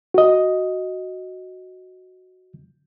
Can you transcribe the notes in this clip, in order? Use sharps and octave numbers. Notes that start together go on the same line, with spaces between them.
F#4 D#5